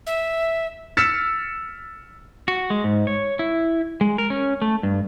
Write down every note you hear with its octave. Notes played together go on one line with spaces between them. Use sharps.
E5
E6 F6 A6 B6 C#7 E7
F#4
G#3
G#2
C#5
E4
G#3
A#4
C#4
A3
G2